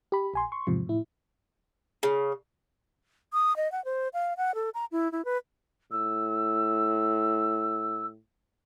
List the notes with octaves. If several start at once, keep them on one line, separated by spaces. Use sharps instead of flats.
G4 B5
A#1 G#5 C6
C6 C#6
E2 G#2 C3 F3
A2 E4
C#3
D#6
D#5
F#5
C5
F5
F#5
A4
A#5
E4
E4
B4
A2 E6